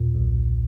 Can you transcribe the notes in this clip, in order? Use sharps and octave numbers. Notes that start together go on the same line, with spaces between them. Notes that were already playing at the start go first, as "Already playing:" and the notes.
Already playing: D#2 A#2
B1